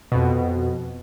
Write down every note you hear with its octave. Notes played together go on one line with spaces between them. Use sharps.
F2 B2